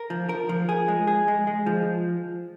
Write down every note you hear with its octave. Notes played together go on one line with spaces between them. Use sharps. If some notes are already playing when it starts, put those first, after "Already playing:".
Already playing: A#4
F3
A#4
F3
G#4
G#3
G#4
G#3
G#3
F3